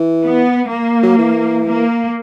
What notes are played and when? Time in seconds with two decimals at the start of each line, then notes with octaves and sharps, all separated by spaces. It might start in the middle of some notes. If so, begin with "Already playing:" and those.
Already playing: E3
0.24 B3
0.71 A#3
1.03 F#3
1.18 E3
1.66 A#3